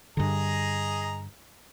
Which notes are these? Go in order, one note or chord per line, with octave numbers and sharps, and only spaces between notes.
G2 D3 G#4 D#5 A#5